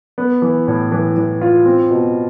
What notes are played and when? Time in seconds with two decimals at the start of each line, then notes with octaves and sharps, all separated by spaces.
0.18 B3
0.42 E3
0.68 A2
0.92 E3
1.16 E3
1.41 F4
1.66 C4
1.91 B2